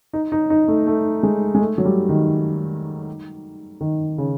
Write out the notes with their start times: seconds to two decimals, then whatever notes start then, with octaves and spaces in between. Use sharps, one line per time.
0.13 D#4
0.32 D#4
0.50 D#4
0.68 A3
0.87 A3
1.23 G#3
1.55 G#3
1.60 A3
1.78 F#3
1.85 G3
2.09 D#3
3.81 D#3
4.18 C#3